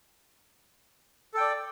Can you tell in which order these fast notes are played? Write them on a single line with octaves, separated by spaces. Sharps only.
A4 G5 D5